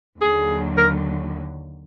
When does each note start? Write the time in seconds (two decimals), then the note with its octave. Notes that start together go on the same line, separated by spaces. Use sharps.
0.21 D#2 D3 F#3 G#4
0.78 A#4